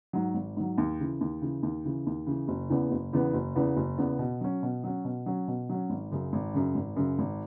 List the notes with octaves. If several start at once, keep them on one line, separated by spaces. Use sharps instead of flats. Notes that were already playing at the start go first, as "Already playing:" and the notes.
G#2 F#3
G#1
G#2 F#3
D#2
C#3 E3
D#2
C#3 E3
D#2
C#3 E3
D#2
C#3 E3
F#1
E2 C#3 E3 B3
F#1
E2 C#3 E3 B3
F#1
E2 C#3 E3 B3
F#1
E2 C#3 E3 B3
B2
F#3 C#4
B2
F#3 C#4
B2
F#3 C#4
B2
F#3 C#4
G#1
F#2 C#3
G#1
F#2 C#3
G#1
F#2 C#3
G#1